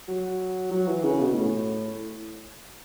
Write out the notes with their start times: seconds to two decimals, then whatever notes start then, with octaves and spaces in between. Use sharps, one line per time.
0.08 F#3
0.71 F#3
0.87 E3
1.03 C#3
1.20 B2
1.35 A2